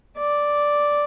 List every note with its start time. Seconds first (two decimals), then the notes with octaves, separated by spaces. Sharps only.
0.18 D5